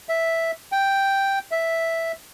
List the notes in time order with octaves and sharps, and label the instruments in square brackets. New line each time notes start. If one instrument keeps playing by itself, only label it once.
[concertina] E5
G5
E5